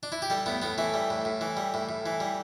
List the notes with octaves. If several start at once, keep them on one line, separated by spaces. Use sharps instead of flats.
D4
E4
G4
G3 A4
A2 B3
A2 B3
E3 A3
G3
A2
A2
E3
G3
A2
A2
E3
G3